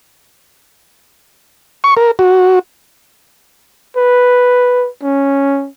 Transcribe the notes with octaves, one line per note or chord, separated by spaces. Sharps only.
C#6
A#4
F#4
B4
C#4